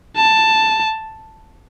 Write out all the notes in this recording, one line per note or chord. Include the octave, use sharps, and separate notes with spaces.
A5